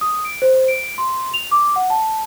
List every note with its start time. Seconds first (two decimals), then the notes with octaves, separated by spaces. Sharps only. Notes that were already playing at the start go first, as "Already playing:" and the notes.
0.01 D#6
0.25 D7
0.42 C5
0.68 D7
0.98 C6
1.34 F7
1.51 D6
1.76 F#5
1.90 A5